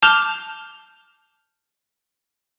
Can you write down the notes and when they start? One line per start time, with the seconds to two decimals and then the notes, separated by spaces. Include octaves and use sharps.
0.02 A5 D6 F6 G6 F7 G7